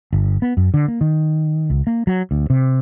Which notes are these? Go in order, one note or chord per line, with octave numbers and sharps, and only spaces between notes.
G1
B3
F#2
D3
A#3
D#3
C#2
A#3
F#3
D2
C3